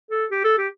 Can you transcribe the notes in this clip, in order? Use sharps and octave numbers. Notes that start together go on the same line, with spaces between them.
A4
G4
A4
G4